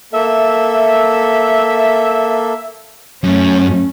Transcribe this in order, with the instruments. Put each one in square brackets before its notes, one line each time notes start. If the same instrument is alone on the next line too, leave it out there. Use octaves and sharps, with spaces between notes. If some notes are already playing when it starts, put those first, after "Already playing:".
[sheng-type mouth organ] A#3 A4 [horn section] E5
[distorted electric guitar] F#2 [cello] A3 C#4